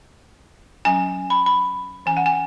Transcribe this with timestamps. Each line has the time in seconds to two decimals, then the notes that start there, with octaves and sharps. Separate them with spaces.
0.85 F#3 C#4 G#5
1.30 B5
1.46 B5
2.06 E3 C#4 G#5
2.17 F#5
2.26 G#5